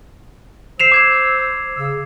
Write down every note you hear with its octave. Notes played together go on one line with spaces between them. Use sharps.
C5 E6 C7 E7 F7
D6 G#6 E7
C#3 E6